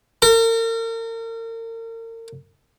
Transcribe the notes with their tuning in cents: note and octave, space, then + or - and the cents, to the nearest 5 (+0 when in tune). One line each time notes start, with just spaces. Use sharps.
A#4 -40